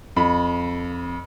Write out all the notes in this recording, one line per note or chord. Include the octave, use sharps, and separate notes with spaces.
F2 B5